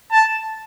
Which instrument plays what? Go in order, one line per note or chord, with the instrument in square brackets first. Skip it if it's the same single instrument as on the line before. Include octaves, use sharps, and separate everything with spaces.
[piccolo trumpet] A5